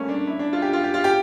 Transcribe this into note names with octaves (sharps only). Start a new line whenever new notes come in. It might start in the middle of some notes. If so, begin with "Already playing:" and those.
Already playing: G3 A3 A#3 C#4
D4
E4
D4
F4
G4
F4
G4
F4
G4